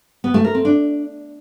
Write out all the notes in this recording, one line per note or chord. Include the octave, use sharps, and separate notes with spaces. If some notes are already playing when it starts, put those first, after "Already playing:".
B3
A3
A#4
C4
D4